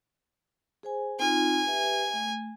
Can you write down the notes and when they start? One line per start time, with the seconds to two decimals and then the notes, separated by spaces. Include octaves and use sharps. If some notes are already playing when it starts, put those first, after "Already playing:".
0.83 G#4 C5 G#5
1.19 C4 D#4 F4 G#5
1.65 G4 B4 E5
2.13 A3